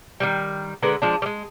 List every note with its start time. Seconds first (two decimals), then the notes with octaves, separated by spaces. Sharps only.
0.20 D#3 E3 G3
0.82 D3 G#3 A#4 B4
1.02 F3 G#3 D4
1.22 G3 G#3